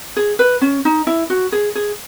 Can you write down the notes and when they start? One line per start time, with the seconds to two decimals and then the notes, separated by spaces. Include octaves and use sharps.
0.17 G#4
0.39 B4
0.61 C#4
0.85 D#4
1.07 E4
1.30 F#4
1.52 G#4
1.75 G#4